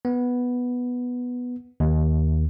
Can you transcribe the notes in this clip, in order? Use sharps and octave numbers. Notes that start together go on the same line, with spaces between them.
B3
D#2